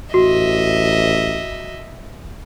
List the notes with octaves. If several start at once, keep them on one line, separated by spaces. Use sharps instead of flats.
A1 F#4 D#5 E5